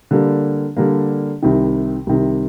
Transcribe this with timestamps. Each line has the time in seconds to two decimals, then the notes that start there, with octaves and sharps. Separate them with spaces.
0.11 D3 G3 A#3
0.77 D3 G3 A#3
1.42 C2 C3 D#3
2.07 C2 C3 D#3